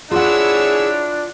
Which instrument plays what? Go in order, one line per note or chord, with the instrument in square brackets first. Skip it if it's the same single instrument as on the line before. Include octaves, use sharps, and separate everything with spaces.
[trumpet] D4 [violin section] E4 C#5 E6 [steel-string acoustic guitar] F4 F#5 [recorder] G#4